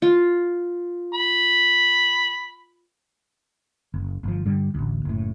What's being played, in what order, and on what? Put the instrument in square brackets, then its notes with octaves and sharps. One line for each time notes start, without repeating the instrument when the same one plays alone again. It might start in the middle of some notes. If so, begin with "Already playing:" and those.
[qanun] F4
[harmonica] B5
[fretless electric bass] F#1
G1 F3
G2 D3 G3
A1 D2
F#1 A2